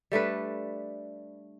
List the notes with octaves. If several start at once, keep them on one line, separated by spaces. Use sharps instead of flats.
G3 A3 D4 B4